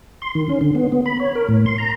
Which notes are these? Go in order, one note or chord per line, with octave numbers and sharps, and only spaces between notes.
C6
D#3
C#4
D3
B3
B3
B5
C#5
A#4
A2
C6
A#5